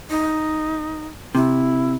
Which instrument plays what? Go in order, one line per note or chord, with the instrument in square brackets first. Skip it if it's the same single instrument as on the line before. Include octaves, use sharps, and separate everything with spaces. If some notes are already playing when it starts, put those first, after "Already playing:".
[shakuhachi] D#4
[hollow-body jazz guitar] C3 [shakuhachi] E4